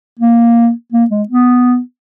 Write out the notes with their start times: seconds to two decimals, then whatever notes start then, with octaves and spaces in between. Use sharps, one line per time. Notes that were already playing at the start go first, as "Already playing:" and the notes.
0.19 A#3
0.92 A#3
1.10 G#3
1.28 B3